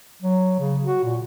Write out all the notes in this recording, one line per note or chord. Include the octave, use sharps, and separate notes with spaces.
F#3
C#3
F#4
A#2